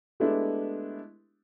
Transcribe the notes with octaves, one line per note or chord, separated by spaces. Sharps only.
G#3 A3 B3 D4 E4 G4